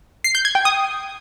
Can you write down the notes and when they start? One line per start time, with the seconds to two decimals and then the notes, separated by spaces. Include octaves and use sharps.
0.24 C7
0.35 G6
0.45 G#6
0.55 G5
0.65 D#6